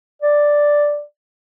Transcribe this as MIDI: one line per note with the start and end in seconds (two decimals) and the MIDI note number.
0.22 1.01 74